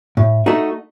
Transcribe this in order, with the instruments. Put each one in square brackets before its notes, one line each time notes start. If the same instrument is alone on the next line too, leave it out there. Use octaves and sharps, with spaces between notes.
[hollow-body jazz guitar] A2
A3 D#4 F#4